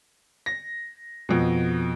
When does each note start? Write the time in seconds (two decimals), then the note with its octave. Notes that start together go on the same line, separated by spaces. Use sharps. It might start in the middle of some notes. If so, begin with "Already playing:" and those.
0.46 A#6
1.29 F2 B2